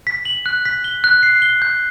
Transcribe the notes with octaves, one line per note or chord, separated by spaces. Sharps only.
B6
F#7
F#6
B6
G7
F#6
C7
G7
G6